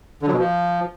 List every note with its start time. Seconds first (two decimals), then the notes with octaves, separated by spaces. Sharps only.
0.22 D3
0.28 F#3
0.33 B2
0.38 F3